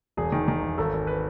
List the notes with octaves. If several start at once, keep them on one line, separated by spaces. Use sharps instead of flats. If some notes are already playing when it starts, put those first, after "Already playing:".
E1 G#4
D#3
D#3
E1
G#1 A4
G#1
B4